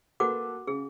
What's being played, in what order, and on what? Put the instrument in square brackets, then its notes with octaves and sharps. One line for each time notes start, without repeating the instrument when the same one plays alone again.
[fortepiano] A#3 A4 B4 [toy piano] F#4 F#5 D6
[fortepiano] C#3 [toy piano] G#4